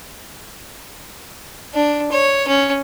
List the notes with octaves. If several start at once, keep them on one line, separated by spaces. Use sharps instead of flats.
D4
C#5
C#4